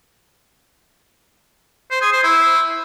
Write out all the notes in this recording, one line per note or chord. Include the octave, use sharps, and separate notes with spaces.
C5
G#4
C5
E4